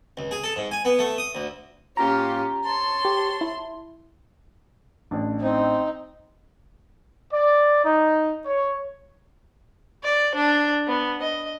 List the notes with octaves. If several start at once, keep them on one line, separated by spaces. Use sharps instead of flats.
C#2
G#4
A4
G#2
G#5
B3
A3
D#6
D2
A2 A#3 C#4 F4 G4 A#5
C#5 A5 C6
G4
E4
A1 D4
C4 D#4
D5
D#4
C#5
D5
D4
B3
D#5